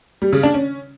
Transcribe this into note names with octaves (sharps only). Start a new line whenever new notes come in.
G3
C#3
D4
C#4